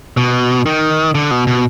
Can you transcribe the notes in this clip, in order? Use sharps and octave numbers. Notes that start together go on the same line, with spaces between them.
B2
D#3
D3
B2
B2